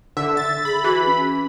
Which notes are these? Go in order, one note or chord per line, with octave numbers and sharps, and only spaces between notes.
D3 E5
A6
G#4 B5
E3 F#4
C#4